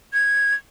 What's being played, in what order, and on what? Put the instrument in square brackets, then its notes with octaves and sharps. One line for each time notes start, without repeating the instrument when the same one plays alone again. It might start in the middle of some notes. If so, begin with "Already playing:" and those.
[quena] G#6